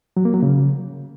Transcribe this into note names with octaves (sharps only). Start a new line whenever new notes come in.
F#3
A#3
F#3
C#3